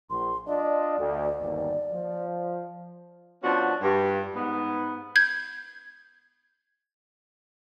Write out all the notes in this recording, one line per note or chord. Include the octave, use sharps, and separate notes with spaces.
A#1 C6
D4 F4 D5 D#5
D2
G1 D#2
F3
F3 B3 C#4 D4 F#4
G2
G#2 B3
G6 G#6